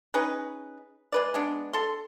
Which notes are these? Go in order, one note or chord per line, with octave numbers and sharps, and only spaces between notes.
C#4 D#4 G#4 B4
G#3 B4 D5
G#3 B3 D4
A4 C6